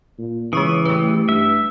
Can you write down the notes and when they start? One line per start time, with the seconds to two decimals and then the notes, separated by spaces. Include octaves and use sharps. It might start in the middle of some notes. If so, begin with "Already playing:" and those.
0.19 A#2
0.53 C#3 E3 G#3 C#6 D#6
0.85 G3 A3 B4
1.29 G2 E5